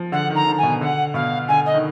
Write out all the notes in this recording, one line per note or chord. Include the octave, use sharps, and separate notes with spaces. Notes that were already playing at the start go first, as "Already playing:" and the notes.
Already playing: F3
D3 F#5
D#3
A#5
D3
G#5
B2
D3 F#5
B2 F5
D3 G#5
D#5
D#3